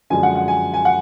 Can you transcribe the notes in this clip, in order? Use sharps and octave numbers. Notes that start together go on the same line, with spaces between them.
F#2 D3 F3 G#3 G#5
F#5
F#5
G#5
G#5
F#5